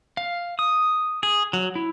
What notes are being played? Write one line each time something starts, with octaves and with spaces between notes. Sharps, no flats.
F5
D#6
G#4
F#3
E4